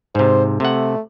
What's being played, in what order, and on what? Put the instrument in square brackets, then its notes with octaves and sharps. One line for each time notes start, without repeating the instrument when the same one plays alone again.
[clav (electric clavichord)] G#2 C3 [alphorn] C5
[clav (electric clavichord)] C3 F#5 [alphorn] A3